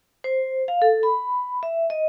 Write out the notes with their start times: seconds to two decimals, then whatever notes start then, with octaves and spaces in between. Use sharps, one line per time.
0.24 C5
0.68 F5
0.82 A4
1.03 B5
1.63 E5
1.90 D#5